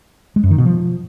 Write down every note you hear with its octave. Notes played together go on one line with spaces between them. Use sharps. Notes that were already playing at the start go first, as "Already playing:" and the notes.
G#3
F#2
D#3
B2
F3